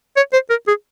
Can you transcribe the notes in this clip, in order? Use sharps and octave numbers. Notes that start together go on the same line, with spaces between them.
C#5
C5
A#4
G#4